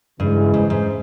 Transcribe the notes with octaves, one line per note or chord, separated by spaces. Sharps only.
G2 C#3 E3 G#3
G#2
G#2